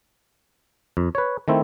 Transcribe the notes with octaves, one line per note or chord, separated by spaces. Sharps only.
F2
B4 C#5
D#3 A3 C4 E4